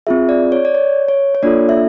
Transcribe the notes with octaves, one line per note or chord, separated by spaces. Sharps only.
C4 F4 G#4 E5
D5
C#5
D5
C#5
C#5
C#5
A#3 D4 F4 A4 D5
E5